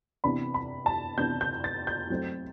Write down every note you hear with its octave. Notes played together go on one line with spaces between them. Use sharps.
C3 E3 B3 D4 B5
B5
A5
C3 E3 B3 D4 G6
G6
A6
G6
F#3 A3 C4